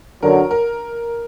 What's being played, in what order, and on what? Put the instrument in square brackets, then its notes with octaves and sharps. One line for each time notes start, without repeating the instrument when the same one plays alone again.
[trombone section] F#2 D3 F#3 [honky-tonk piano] A#4
[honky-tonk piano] A#4